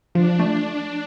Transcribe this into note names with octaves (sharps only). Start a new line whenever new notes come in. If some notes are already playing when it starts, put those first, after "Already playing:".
F3 D4
A3